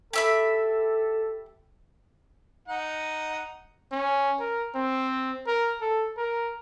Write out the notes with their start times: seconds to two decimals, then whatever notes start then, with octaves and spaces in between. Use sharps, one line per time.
0.13 G4 A4 E5 B5
2.68 D#4 F#5
3.92 C#4
4.40 A#4
4.75 C4
5.47 A#4
5.81 A4
6.17 A#4